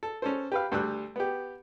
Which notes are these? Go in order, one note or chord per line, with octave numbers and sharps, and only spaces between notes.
A4
C#4 A4 C5
G4 B4 F5
D2 G3 E6 F#6
B3 G4